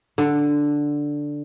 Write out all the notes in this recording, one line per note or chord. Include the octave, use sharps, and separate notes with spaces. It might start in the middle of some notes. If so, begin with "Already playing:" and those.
D3